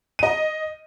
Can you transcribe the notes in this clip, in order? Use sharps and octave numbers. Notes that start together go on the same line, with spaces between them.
D#5 D#7